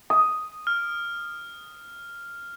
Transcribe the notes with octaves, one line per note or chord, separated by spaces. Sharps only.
D#6
F6